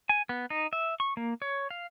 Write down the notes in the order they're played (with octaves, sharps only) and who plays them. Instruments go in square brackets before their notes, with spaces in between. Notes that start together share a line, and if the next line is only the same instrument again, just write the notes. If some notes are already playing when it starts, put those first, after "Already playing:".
[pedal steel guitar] G#5
B3
D#4
E5
C#6
A#3
C#5
F5